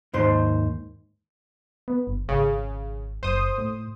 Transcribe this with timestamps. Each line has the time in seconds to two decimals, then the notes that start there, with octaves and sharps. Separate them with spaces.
0.14 D#2 G#2 C5 C6
1.88 B3
2.07 G1
2.29 G#1 C#3
3.23 F#1 C5 D#6
3.58 A2